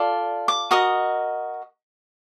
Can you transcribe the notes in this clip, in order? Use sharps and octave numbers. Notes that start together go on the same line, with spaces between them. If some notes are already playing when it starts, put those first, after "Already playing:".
Already playing: F4 A4 D5
D6
F#4 A#4 D#5 D#6